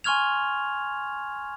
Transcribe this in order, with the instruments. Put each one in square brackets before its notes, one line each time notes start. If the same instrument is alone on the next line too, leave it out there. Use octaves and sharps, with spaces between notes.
[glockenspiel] G#5 C6 C#6 F6 G#6 F7